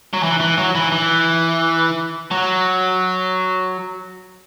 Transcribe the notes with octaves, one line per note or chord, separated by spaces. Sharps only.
F#3
E3
E3
F#3
E3
E3
F#3